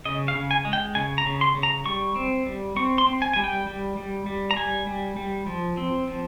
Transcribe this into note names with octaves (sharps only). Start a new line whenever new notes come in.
C#3 D#5
F5
C#3
G#5
G#3
G5
C#3 G#5
A#5
C#3
C6
C#3
A#5
G3 C#6
C4
G3
C4 C#6
C6
C4
G#5
G3 G#5
G5
G3
G3
G3
A#5
G3 G#5
G3
G3
F3
C4
F3